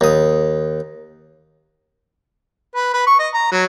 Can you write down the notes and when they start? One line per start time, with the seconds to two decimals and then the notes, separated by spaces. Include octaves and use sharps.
0.01 D#2 D#6
2.76 B4
2.93 B4
3.06 C#6
3.19 D#5
3.34 A#5
3.52 F#3